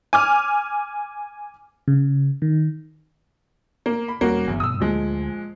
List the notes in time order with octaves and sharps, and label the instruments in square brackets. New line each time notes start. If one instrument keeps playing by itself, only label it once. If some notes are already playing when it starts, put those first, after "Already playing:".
[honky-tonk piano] G#5 D6 F6
[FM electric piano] C#3
D#3
[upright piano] A#3
B5
[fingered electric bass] D#1 G3 [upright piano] A#3 C#4 F#4
[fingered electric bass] G1 B2 F#3 [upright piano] E2
[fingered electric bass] G2 B2 [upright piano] D#6 E6
[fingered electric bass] D2 [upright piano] A#2 F3 G#3